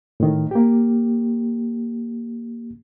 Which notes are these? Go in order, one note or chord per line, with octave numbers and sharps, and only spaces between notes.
A2 D#3
A#3 G4